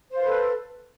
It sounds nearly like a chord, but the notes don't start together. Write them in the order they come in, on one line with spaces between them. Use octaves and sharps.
C5 F5 B4 A4